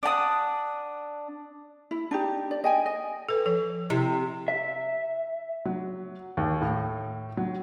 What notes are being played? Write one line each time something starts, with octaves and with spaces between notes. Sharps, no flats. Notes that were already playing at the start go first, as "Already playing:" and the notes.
D4 F#5 A5 D#6
E4
D4 D#4 G4
D5
D#5 G5 G#5
D#5
A4 B4
F3 A4
C3 E4
E5
F#3
D#2
A2
F#3